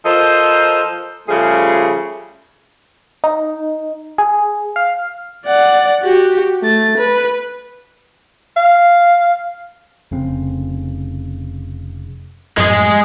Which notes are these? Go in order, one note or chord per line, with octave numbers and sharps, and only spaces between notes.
F3 A4 A#4 C5 D#5
C#3 F3 G3 A3 G#4
D#4
G#4
F5
D5 F#5
F#4 G4
A3 A6
B4
F5
F1 C#3 C4
F#2 A2 F3 G#3 G#4